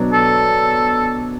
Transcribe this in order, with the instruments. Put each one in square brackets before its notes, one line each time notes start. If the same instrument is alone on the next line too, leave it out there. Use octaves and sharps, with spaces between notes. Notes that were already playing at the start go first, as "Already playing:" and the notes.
Already playing: [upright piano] B2 F#3 B3 D4
[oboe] A4